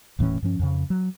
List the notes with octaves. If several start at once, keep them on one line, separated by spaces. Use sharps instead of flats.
D#1 A2 E3 C#4
G2 F3 C#4
F2 C#3
F#3